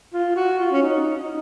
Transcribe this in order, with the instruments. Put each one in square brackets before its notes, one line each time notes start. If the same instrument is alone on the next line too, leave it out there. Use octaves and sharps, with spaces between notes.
[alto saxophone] F4
F#4
F4
C#4
D#4
D#4